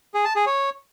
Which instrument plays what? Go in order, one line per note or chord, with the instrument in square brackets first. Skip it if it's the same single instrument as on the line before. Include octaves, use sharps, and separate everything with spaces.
[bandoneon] G#4
A5
G#4
C#5